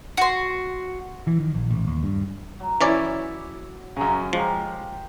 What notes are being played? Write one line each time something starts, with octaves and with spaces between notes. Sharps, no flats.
F#4 C6
E3
D#3
A#1
A1
D#2
G2
F#3
E3 C#4 E4 C#5 D5 D6
F#2 C#3 A#5
F3 G#3 F4 G4 A#4